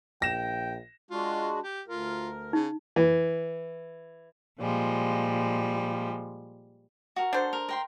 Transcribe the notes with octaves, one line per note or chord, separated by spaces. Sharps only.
A#1 G5 A#6 E7
G#3 D4 F4 F#4
G4
D2 F4 A#4
C#3 D#4
E3
A#2 F3 G3 G#3
F#4 A#4
D4 A4 C5
A#4
A#4 G5 C6